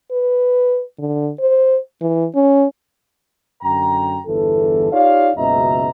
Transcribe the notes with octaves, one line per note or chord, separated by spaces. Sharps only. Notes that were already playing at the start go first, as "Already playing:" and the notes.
B4
D3
C5
E3
C#4
F#2 D3 G5 A#5
G1 E2 E3 A4
D#4 F4 G4 C#5 D5 F5
F#1 C#2 B2 D#5 E5 A#5